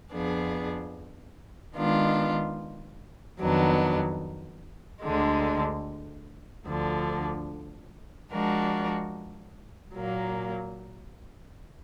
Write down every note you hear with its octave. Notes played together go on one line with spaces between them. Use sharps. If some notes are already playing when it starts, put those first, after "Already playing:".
F2 F3 B3 D4 G#4
D#3 G#3 B3 D4 F4
F2 D#3 F#3 B3 D4
D2 D3 G#3
D2 D3 F3
F3 G#3 D4 F#4 A#4
A#2 F#3 A#3